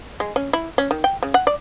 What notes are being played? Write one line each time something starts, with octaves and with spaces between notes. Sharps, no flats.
G#3
C#4
E4
C#4
D#3
G5
C#3
F#5
D5